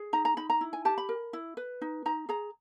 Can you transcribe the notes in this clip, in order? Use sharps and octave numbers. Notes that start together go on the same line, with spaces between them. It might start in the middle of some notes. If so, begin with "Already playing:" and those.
Already playing: G#4
D#4 A#5
A#5
D#4 B5
A#5
E4
G#5
G4 A5
B5
A#4
E4
B4
D#4
D#4 A#5
G#4 A#5